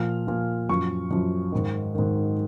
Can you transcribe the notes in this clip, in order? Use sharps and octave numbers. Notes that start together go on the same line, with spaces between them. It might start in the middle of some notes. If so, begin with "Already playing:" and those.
Already playing: A#2 F3 F6
A#2 F3
F#2 F3 C#6
F#2 F3
G#2 D#3
G#2 D#3